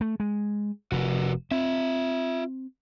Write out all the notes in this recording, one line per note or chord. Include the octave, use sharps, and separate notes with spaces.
A3
G#3
F1 F#4 A#4 B4
C4 F4 E5